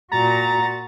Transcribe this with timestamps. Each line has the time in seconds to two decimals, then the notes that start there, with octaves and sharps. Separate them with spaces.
0.12 A#2 F#4 A#5 A6